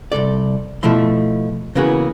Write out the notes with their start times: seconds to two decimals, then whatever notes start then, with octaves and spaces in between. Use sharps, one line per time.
0.12 C2 G#2 A4 D5
0.83 B2 F3 A3 E4 C6
1.75 C#3 E3 A#3 B3 F#4 G#4